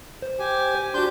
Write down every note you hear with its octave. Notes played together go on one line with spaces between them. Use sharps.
C5
G4 G#5
D4 F#4 G4 C6 G6